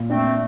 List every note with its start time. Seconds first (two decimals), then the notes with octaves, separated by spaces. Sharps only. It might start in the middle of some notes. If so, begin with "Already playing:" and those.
Already playing: A#2
0.09 A3 C4 D4